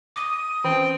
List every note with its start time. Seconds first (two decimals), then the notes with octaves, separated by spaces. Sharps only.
0.16 D6 D#6
0.64 E3 C4 C#4 G5